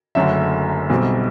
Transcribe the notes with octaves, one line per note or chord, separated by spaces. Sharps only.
F#1 F#2 D3 F#3 A3 E5
B1 B2 G3 C4